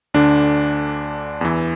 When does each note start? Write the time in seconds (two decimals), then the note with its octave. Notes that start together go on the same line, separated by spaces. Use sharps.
0.14 D2 D3 D4
1.41 E2 E3